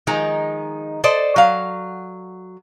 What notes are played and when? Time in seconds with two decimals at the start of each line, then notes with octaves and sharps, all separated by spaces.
0.07 D#3 F3 G#3 D#4 A#5
1.04 A4 C5 D5 D#5
1.36 F#3 F5